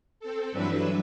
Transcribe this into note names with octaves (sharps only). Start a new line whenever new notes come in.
C4 A4
G2 E3 F#3 D4 B4 E5